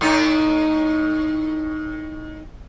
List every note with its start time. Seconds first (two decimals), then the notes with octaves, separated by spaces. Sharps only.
0.01 A2 D#4